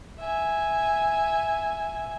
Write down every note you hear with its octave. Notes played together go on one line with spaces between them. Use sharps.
E5 G#5